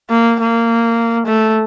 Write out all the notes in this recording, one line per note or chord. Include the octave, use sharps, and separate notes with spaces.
A#3
A#3
A3